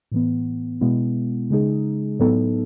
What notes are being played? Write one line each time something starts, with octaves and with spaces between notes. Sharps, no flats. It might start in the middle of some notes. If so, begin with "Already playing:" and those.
A2 E3 B3
B2 G#3 B3 E4
C#3 G#3 D#4 G#4
A2 F#3 B3 D#4 A4